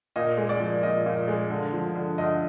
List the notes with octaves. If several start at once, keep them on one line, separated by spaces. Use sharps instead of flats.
A#2 D#5
G#3
D5
F3
A#2 D#5
A#2
G#3
D3
F3
D3
D2 D#5